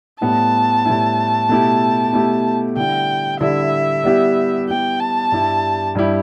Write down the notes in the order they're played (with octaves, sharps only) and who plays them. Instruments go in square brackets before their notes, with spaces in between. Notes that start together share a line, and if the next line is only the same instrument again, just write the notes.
[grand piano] A2 G3 B3 E4 [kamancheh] A5
[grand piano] A2 G3 B3 E4
B2 A3 E4 G4
B2 A3 E4 G4
[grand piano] D3 G3 E4 [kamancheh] G5
[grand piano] D3 G3 E4 [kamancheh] E5
[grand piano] G3 B3 E4 G4
[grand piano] G3 B3 E4 G4 [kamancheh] G5
[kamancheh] A5
[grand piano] G2 G3 E4 G4
G2 G3 E4 G4